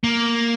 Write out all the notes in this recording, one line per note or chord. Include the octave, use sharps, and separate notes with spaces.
A#3